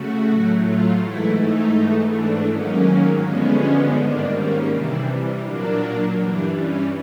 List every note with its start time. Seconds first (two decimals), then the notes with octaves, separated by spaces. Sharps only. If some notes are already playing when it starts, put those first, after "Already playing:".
Already playing: C#3 A3 F#4
0.27 A2 F#3 A3
0.64 F4
1.00 G#2 E3 A3 E4
1.38 D#4
1.75 G#2 E3 A3
2.12 D4
2.49 G#2 D#3 F#3 A#3 C#4
3.22 G2 D3 F3 G#3 B3 C#4
3.96 G#2 D#3 G3 A#3 D4
4.33 C#4
4.70 C3 E3 G3 D4
5.43 A#2 F#3 A#3 D4
6.18 G2 E3 G3 D4
6.54 C#4